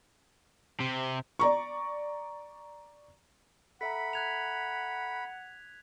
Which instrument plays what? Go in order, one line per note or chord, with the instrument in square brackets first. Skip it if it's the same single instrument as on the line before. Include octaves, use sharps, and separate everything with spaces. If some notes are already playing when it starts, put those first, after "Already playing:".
[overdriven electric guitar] C3
[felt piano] D5 A#5 C#6
[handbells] A4 E5 A#5 [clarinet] F#5 [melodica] B5 [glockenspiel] B6
[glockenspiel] F#6 G#6 F7